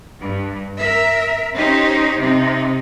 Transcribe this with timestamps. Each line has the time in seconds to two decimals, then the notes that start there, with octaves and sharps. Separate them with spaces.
0.21 G2
0.79 A#4 E5
1.55 C#4 D#4 G4 C5
2.18 C3 D#4